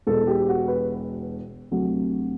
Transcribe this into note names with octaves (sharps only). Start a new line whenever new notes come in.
E1 E2 B2 A4
G4
F#4
B4
D2 C3 F#3